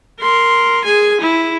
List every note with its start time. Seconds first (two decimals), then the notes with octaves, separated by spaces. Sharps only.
0.20 A#4 C6
0.85 G#4 G#5
1.21 E4